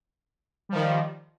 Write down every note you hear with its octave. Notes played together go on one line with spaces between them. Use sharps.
D#3 F3 G3